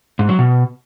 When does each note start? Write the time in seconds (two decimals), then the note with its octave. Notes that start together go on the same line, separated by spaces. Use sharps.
0.19 G#2
0.29 F#3
0.39 B2